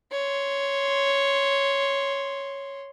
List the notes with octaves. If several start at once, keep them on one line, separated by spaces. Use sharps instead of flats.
C#5 C6